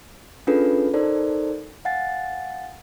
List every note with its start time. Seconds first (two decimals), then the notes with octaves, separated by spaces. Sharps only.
0.47 C#4 D4 F4 G#4 A4 B4
0.94 D#4 A4 A#4 C5 D5
1.85 F5 F#5 G#5 A6